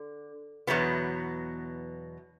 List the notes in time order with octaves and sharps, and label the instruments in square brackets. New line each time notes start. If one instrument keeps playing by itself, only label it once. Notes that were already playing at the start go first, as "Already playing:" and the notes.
Already playing: [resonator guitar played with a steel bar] D3
E2 B2 F#3 B3